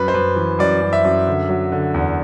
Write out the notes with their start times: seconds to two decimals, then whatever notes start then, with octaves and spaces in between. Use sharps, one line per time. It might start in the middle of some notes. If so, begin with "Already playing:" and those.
Already playing: F#2 B4
0.08 C5
0.14 F#2 B4
0.36 E3
0.59 F#2 D5
0.82 F#2
0.93 E5
1.04 F#2
1.27 D3
1.49 F#3
1.72 D3
1.94 E2